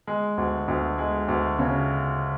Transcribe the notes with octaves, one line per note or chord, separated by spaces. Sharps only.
G#3
D2
D2
G#3
D2
C#3